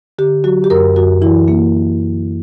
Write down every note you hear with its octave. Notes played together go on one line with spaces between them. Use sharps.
D3 G4
F#3 F#4
G4
F#2 A#4
F#2 F#4
E3 E4
A#3